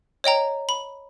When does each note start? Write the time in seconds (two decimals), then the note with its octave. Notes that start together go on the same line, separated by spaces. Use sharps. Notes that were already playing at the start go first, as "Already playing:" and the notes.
0.24 C#5 D#5 G5 A#5
0.69 B5